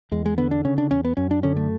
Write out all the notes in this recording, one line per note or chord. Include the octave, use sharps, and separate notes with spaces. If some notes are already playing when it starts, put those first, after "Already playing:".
E2 G#3
G#3
D3 B3
D4
C#3 C#4
D4
E2 C#4
B3
F#2 C#4
D4
D3 C#4
A3